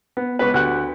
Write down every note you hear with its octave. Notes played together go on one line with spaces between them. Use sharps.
B3
C#2 B3 B4
D2 G4 F#5 F#6